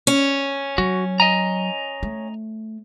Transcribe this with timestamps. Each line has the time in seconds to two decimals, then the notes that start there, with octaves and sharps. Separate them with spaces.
0.07 C#4
0.78 F#3 F#4
1.20 D#5 G#5 A#5
2.03 A3